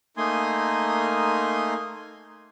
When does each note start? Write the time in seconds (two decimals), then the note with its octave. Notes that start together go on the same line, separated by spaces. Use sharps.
0.17 A3 A#3 D#4 G#5 C6 D#6